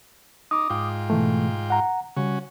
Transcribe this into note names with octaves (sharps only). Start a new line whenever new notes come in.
D#4 D6 D#6
G#2 F4 G5
B2 E3 A3
F#5 A#5
C#3 G3 C#4 F#4